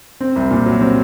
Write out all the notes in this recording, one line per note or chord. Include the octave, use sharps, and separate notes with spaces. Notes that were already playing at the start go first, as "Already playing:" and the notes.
C4
C2
A#2
F#3
C4